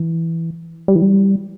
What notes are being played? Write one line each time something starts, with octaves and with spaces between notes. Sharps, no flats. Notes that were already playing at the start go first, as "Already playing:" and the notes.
Already playing: E3
G3
E3
G3